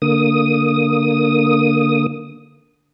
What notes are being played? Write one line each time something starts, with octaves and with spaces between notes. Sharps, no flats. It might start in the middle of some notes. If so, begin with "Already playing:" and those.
D3 A#3 D#6